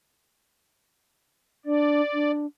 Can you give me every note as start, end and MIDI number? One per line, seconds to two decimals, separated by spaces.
1.66 2.01 62
1.66 2.31 74
2.14 2.46 62